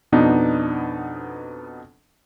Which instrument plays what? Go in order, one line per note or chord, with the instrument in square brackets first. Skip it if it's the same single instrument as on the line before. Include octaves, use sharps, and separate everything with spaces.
[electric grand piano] F2 B2 B3 D4 D#4